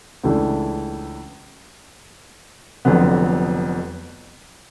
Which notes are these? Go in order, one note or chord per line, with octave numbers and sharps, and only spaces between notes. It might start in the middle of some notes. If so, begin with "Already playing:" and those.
C#2 C#3 E3 A3 D4
F1 F2 D3 F#3 B3